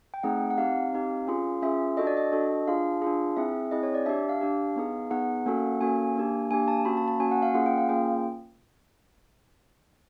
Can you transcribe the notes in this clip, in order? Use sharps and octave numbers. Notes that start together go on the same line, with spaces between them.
G5
A3 C4 D#4 G#4 F#5
F#5
C4 D#4 G4 F5
C4 D#4 G4
C#4 F4 G#4
C#4 F4 G#4 E5
D4 F#4 A4 D#5
D5
D#5
D4 F#4 A4
D4 F4 G#4 F5
D4 F4 G#4
C4 E4 G#4 E5
C4 E4 G#4 D#5
C#5
D5
D4 G4 E5
F5
D4 G4
B3 D#4 G#4
B3 D#4 G#4 F#5
A#3 C#4 F#4 A4
A#3 C#4 F#4 A4 G#5
A#3 D4 G4
A#3 D4 G4 G#5
A5
A#3 C#4 F#4 B5
A5
A5
A#3 C#4 F#4 G#5
F#5
F5
A#3 C#4 F4 G#4 F#5
G5
F5
A#3 C#4 F4 G#4 G5